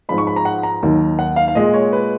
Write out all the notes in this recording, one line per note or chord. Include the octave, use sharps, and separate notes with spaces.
G#2 F3 G#3 B5
C#6
B5
A#5
F#5
A#5
D#2 D#3 F#3
F#5
F5
F5
A#2 G#3 D#5
C#5
B4